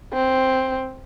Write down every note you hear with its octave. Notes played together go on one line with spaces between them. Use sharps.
C4